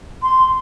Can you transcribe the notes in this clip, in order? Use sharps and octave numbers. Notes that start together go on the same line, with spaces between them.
C6